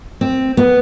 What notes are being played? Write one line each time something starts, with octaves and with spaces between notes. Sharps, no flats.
C4
B3